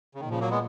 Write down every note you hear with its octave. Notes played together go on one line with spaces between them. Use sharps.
C#3
A#2 D#3
C#3 F3
F#3 A#3
G#3 B3